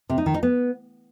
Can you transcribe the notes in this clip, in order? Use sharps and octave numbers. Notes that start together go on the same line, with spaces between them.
C3
D#4
D#3
D#4
B3